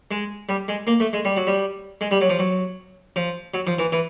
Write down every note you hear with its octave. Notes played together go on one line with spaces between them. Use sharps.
G#3
G3
G#3
A#3
A3
G#3
G3
F#3
G3
G#3
G3
F#3
F3
F#3
F3
F#3
F3
E3
E3